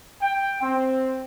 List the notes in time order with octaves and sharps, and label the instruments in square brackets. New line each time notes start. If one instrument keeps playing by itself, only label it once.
[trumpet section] G5
C4